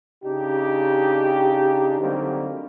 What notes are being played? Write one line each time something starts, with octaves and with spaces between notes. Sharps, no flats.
C#3 D4 D#4 G4
D3 F#3 G3 A#3 C4 D#4